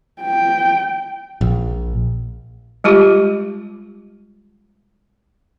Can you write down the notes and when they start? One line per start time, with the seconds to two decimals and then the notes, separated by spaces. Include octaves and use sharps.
0.22 G5
1.41 A#1
2.84 G3 G#3 F4 G4